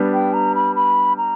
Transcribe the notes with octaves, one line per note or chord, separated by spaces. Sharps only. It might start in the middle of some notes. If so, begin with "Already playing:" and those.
Already playing: G3 B3 D4
G5
A#5
B5
B5
A#5